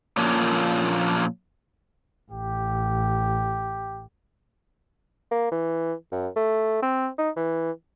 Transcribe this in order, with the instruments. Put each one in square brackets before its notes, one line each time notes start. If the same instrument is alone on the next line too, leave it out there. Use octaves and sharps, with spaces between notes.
[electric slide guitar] A#2 F3 A#3 C#4 D4 F4
[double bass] A1 [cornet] G4
[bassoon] A#3
E3
F#2
A3
C4
D#4
E3